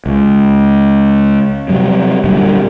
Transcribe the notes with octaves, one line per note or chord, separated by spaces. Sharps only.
C#2
C3 F#3 G3
A#2 D3 G3